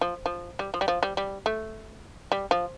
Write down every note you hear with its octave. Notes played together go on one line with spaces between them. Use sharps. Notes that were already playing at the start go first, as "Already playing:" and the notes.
F3
F3
G3
F3
G3
F3
G3
G3
A3
G3
F3